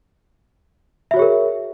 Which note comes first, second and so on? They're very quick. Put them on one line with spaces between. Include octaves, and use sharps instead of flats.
E5 F#4 C#5 G#4 A#4